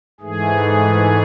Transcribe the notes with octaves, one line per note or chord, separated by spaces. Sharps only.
G#2 E3 A3 G#4